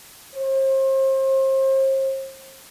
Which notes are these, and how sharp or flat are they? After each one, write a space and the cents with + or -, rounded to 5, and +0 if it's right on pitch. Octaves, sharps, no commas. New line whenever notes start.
C5 +35